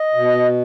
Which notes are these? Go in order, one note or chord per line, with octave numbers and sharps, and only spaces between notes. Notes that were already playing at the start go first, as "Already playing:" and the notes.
Already playing: D#5
B2